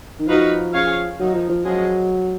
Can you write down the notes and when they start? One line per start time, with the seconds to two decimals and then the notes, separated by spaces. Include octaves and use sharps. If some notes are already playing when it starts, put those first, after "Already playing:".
0.19 D#3
0.27 F3 D#4 F#4 B4 F5
0.73 C#4 G#4 C#5 F5
1.19 D#3 F#3 A#3 D#4
1.34 F3
1.49 F3
1.64 F3 F#3 G#3 C#4 G#4 D#5